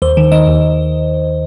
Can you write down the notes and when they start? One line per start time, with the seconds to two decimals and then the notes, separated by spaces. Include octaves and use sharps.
0.02 D#2 C5
0.17 D#3
0.32 D#3 D#5
0.47 D#2